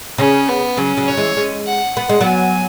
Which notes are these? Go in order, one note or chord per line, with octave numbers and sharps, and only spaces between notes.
C#3 C#4
B3
C#3 F#3 C#4
C#3 F#3
F#3 C#5
E3 G#3
G#3 C#4
F#5
B3 F#5
G#3
F#3 B3
G#5